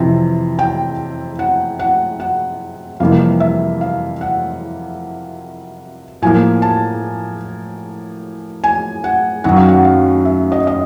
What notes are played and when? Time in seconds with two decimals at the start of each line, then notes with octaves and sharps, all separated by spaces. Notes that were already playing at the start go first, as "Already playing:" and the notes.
Already playing: F2 C3 E3
0.59 G5
1.39 F#5
1.79 F#5
2.20 F#5
3.00 F2 C3 E3 G3 A#3 F5
3.40 E5
3.81 F5
4.21 F#5
6.22 A2 F3 A#3 G#5
6.62 A5
8.64 G#5
9.04 F#5
9.44 F#2 D#3 F#3 F#5
9.56 F5
9.69 F#5
9.85 F5
10.25 E5
10.52 D#5
10.67 D#5